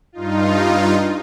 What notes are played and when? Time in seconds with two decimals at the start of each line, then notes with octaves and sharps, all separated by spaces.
0.12 G2 D#4 F4